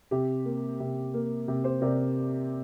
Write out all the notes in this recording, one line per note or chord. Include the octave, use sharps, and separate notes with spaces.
C3 G4
A#3
C3
A#3
C3
G4 C5
C3 A#4 D5